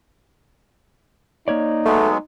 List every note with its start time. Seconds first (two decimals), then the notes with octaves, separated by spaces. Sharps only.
1.48 A#3 D#4 C#5 D5
1.85 F#3 G#3 A3 B3